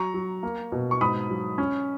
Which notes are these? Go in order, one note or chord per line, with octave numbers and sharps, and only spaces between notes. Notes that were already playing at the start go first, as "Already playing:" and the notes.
Already playing: F#3 A#5 C#6
F#3
A#3
B2
C#6
G#2 B5 D#6
F#3
C#4